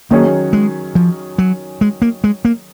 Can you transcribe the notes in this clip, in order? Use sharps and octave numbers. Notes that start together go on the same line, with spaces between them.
D#3 F#3 A#3 C#4 G#4 C#5
G#3
F3
F#3
G#3
A#3
G#3
A#3